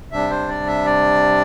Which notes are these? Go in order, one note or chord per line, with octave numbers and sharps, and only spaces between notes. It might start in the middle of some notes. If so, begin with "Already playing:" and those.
C3 G3 D4 E5
C5
D5
E5
D5